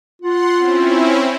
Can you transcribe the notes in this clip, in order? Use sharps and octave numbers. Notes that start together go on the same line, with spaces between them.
F4 F#5 C6
C4 C#4 E4